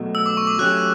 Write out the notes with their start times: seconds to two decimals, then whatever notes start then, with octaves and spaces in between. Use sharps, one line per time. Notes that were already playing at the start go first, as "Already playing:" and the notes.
Already playing: B2 F#3 A3
0.15 E6
0.26 D6
0.37 C#6
0.47 D6
0.59 F#3 A3 C#4 G4 F#6